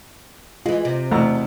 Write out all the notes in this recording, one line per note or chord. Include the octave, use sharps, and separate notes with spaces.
E3 G#3 F4
C3
E2 B2 A3 A#5 E6